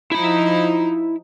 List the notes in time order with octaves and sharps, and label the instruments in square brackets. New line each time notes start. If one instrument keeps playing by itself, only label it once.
[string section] F3 D#4 [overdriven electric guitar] E4 B5